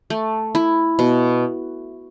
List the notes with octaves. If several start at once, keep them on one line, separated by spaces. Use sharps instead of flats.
A3
E4
B2